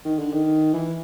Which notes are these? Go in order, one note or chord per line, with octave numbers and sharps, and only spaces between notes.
D#3
D3
D#3
E3